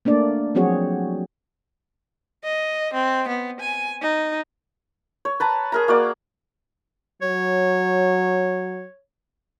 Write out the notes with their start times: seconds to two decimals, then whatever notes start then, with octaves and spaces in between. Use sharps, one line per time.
0.05 A3 A#3 D4 D5
0.55 F3 F#3 C4 F#4 G#4 C#5
2.44 D#5
2.94 C4
3.28 B3
3.60 G#5
4.02 D#4
5.25 C#5
5.40 B4 A5 A#5
5.72 G#4 A#4 A#5
5.88 A#3 F#4 D5
7.22 F#3 C#5